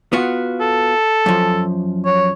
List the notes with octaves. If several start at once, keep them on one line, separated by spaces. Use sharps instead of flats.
B3 F4 F#4
A4
F#2 F3
C#5